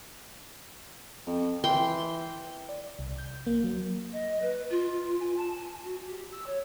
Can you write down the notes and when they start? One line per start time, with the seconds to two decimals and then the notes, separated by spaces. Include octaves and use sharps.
1.27 F2
1.64 E3 G5 C6
2.69 D5
2.99 C2
3.18 G6
3.47 A#3
3.64 F#3
4.12 D#5
4.41 B4
4.70 F4
5.20 G#5
5.37 A5
5.55 G#5
5.83 F#4
6.06 G4
6.31 E6
6.46 C#5